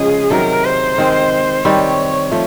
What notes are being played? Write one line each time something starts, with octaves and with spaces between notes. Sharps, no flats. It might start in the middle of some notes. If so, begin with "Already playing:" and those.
Already playing: C#3 F3 G#3 G#4
C3 D#3 F#3 A#4
C5
D#3 G#3 C4
D#3 G3 C4 C#5
F3 A3